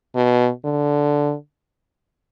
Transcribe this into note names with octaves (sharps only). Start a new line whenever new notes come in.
B2
D3